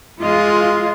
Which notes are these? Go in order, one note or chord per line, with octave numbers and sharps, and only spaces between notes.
G#3 F4 D#5